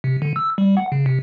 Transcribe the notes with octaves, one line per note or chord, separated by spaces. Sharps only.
C3
D3
E6
G3
F#5
C#3
C3